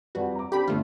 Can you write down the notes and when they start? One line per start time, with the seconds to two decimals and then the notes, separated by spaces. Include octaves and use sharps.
0.15 F2 G3 F#4 B4
0.35 A#5 D6
0.52 C4 D4 G4 A4 B5
0.67 G1 D3 A3 F4